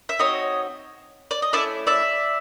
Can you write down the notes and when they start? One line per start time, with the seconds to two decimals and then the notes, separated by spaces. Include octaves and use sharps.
0.09 E5
0.19 C4 D#4 F#4 C#5 D#5
1.31 D5
1.42 D#5
1.53 A3 C#4 E4 D5 E5
1.87 D5 E5